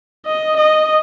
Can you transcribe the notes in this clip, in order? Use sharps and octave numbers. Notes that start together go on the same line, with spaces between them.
D#5
D#5